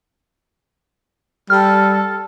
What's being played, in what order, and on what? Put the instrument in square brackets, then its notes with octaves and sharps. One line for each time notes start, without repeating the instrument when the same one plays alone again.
[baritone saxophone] G3 [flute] A4 [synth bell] F6